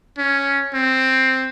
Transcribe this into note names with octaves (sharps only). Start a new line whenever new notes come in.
C#4
C4